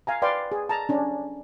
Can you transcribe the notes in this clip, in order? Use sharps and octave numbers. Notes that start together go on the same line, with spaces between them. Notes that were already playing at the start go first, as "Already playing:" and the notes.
F5 G#5 A#5
B4 D5 F5 G5 C6
G#4
A5 A#5
C#4 D4